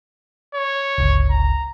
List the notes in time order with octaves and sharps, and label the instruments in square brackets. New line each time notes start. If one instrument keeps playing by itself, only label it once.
[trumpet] C#5
[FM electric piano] G1 C#2
[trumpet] A#5